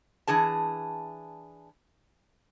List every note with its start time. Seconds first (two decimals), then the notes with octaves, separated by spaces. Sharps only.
0.27 E3 D4 G#4 A5